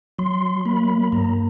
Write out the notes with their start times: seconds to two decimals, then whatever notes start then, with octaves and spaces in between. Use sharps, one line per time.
0.19 F#3 C6
0.65 A#3 B5
1.12 G2 A#5